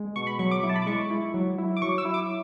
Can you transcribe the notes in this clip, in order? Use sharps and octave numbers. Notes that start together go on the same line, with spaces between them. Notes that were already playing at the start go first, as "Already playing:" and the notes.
Already playing: G#3
B2 C#6
B5
F#3 C#6
D6
E4 C#6
A5
B5
D6
G#3 C#6
E4
F#3
E4
D6
F#3 C#6
E6
E4
D6